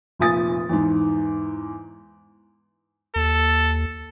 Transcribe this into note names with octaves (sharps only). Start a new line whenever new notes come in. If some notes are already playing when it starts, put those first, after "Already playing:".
F1 A#2 F3 G#5 D#6 A6
E2 G#2
D#2 A4